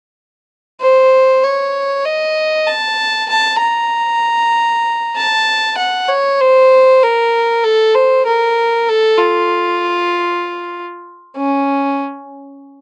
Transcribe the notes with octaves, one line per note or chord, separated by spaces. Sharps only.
C5
C#5
D#5
A5
A5
A#5
A5
F#5
C#5
C5
A#4
A4
C5
A#4
A4
F4
C#4